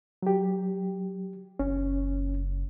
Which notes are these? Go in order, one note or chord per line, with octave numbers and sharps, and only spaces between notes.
F#3 G4
F#1 C#4